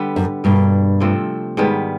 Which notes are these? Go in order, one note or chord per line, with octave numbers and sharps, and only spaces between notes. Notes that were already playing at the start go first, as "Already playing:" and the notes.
Already playing: D3 G3 B3
F#2
G2 B2 G3 A#3
C3 F3 A3 C4
G#2 D#3 G3 B3